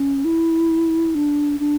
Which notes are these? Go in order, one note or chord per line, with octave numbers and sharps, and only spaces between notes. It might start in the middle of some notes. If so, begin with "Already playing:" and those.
Already playing: C#4
E4
D4
D4